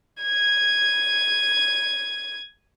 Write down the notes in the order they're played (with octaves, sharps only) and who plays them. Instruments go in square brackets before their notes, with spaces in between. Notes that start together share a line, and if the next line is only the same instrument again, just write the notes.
[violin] G#6 D#7